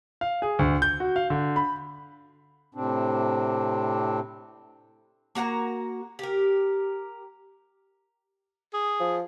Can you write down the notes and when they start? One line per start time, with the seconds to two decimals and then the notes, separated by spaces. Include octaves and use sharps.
0.21 F5
0.42 G#4
0.59 D2
0.82 G6
1.00 F#4
1.16 F5
1.30 D3
1.56 B5
2.75 A2 C3 C4 D4
5.35 A#3 F#4 F#5 A#5
6.19 G4 A#4
8.73 G#4
9.00 F3